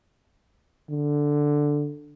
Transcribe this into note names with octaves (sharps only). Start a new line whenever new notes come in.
D3